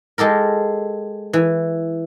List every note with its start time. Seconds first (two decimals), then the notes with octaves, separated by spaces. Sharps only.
0.18 G#3 G4 A4 A#4
1.33 E3